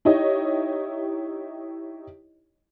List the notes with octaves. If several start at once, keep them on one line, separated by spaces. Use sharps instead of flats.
D#4 E4 G4 C#5 D#5